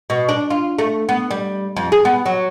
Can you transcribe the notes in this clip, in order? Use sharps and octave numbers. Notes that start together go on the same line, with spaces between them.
B2
D4
F4
A3
B3
G3
F2
G#4
B3
F#3